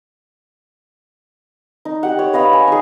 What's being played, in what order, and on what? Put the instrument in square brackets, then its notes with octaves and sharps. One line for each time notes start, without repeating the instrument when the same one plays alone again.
[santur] D#4
G4 F#5
C#5
B4 D#5 F5 B5
G#5
D#4 G#4